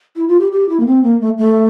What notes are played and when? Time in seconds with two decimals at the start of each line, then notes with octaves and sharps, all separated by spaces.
0.16 E4
0.28 F4
0.41 G4
0.52 G4
0.69 E4
0.80 A#3
0.87 C4
1.03 A#3
1.21 A3
1.38 A3